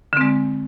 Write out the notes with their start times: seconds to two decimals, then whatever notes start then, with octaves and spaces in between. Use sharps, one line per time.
0.13 D3
0.17 C4
0.21 G#3